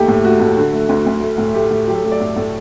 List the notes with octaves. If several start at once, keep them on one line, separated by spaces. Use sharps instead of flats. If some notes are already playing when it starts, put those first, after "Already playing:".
Already playing: D#2 A3 G4
A2
A3 F#4
A2
D3
A3
D2 F#4
D2
A3
A2
A3 G4
A2
F#3 G4
A4
A3 G4
D5
A2
A2